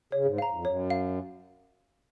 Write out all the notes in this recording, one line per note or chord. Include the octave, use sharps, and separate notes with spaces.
C#3 C#5
G#2
F5 A#5
F2
F#2 C#5
F5